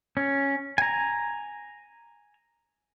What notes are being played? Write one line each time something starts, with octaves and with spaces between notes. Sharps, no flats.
C#4
G#5 A#5